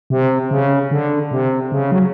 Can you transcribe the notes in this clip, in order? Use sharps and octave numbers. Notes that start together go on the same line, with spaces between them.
C3
C#3
D3
C3
C#3
F#3